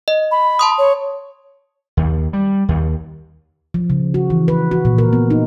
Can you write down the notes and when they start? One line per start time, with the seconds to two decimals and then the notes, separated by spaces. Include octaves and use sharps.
0.08 D#5
0.31 B5
0.59 A5 C6 D#6
0.78 C#5
1.97 D#2
2.33 G3
2.69 D#2
3.74 F3
3.90 C#3
4.14 F#4
4.30 E3
4.48 B4
4.71 F#4
4.85 A#2
4.98 A#4
5.13 B3
5.30 D#4